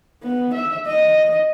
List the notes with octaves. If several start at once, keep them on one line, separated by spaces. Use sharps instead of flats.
B3
E5
D#5